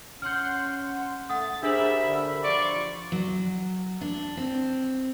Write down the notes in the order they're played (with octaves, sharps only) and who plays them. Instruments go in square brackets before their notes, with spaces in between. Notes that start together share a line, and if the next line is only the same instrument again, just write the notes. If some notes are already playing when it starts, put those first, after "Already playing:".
[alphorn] C#4 [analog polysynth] F#5 C6 [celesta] F6 G6
[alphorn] A3 [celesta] F#5 D#6 [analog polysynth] A6
[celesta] D4 C5 [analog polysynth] G4 A#4 B5 [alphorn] G#4 [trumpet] E5
[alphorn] D3
[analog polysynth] F3 C6 C#6 [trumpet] D5
[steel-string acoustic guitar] F#3
D4
C4